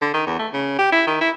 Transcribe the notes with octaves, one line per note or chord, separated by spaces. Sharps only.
D3
D#3
E2
A3
C#3
G4
E4
D#3
E4